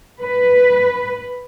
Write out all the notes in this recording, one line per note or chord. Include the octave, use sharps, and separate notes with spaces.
B4